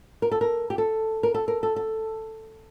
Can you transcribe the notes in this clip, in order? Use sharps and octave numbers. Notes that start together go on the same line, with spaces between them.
A#4
A4
A#4
G4
A4
A#4
A4
A#4
A4
A4